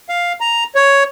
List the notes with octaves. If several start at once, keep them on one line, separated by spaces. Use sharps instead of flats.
F5
A#5
C#5